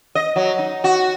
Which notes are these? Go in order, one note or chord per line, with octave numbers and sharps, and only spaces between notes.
D#5
F#3
D#4
F#4